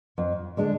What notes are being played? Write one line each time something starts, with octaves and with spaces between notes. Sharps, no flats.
F2
D3 G#3 D4